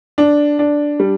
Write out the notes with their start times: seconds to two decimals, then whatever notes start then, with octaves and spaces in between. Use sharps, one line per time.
0.18 D4
0.59 D4
1.00 G3